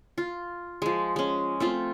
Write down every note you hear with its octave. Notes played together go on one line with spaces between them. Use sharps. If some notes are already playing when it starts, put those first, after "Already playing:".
F4
F3 G#3
G#3 C#4
A3 C4 F4